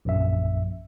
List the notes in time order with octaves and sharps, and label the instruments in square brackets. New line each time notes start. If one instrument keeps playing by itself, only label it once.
[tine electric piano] A#1 F#2 E5